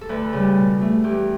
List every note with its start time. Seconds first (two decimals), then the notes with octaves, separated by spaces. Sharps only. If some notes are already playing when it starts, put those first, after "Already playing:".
0.01 A4
0.09 D2 B4
0.33 C#3 G3
0.57 B2
0.81 A3
1.04 E2 G4